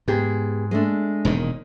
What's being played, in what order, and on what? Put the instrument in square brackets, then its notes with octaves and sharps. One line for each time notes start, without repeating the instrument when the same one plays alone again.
[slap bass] G#2 [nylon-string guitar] B3 G4 G#4
[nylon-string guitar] G#3 A3 D4
[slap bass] E1 A#2 D#3